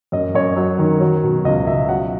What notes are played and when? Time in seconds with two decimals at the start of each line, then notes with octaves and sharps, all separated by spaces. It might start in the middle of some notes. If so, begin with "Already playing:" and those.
0.12 F#2 D#5
0.34 F#2 C#5
0.56 F#3
0.79 D#3
1.00 F#3
1.23 B2
1.45 C#2 D#5
1.67 B2 E5
1.89 F#3 F#5